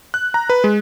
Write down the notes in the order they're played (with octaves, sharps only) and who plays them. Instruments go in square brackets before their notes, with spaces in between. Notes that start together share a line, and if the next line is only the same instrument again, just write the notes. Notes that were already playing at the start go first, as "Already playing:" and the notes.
[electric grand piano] F#6
A#5
B4
G#3